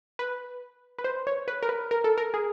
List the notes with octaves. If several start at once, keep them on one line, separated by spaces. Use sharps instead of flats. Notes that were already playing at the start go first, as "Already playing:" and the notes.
B4
B4
C5
C#5
B4
A#4
B4
A#4
A4
A#4
G#4